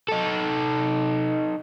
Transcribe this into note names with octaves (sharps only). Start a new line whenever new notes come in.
D#4 A4